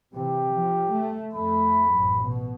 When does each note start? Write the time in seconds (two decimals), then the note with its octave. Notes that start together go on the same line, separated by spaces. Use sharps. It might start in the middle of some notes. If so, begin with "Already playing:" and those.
0.14 C3 E3 G4
0.53 F3
0.92 A3
1.33 F2 A3 B5
1.92 A1 F#2
2.24 B2